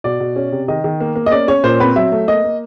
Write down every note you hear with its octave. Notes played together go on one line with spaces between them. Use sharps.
B2 D5
B2
C#4
C3
D#3 D#5
D#3
A#3
A#3
D#5
C#4 D5
C#4 C#5
A#2 C5
C4 B4
F#3 E5
A3
A#3 D#5
A#3